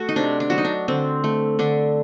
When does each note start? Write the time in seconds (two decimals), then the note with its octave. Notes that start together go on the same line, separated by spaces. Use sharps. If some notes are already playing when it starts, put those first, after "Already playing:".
Already playing: A3 F#4
0.09 D#4
0.16 C3 D4
0.40 D4
0.50 F#3 F#4
0.58 D#4
0.65 D4
0.88 D3 C4
1.24 A3
1.59 D3 D4